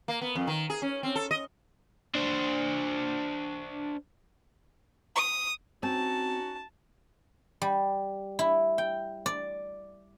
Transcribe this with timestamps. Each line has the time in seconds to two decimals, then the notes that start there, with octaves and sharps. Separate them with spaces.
0.08 A#3
0.22 B3
0.35 F2
0.47 D#3
0.70 G#4
0.82 C#4
1.03 C4
1.16 A4
1.31 D#5
2.15 D4 C5
5.16 D#6
5.83 C4 C#4 D#4 F#4 A5
7.62 G3
8.39 E4
8.78 G5
9.26 D5